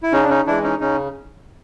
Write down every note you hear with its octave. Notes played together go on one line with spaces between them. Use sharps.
E4
C#3 C#4 D#4
D4
C#4 D#4
E3 G#3 D4 E4
C#4 D#4
C#3 C#4 D#4